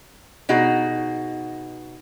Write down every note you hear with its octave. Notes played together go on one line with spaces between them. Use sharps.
B2 D#4 F#4 G#4